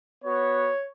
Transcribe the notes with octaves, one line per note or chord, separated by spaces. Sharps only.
B3 F#4 C#5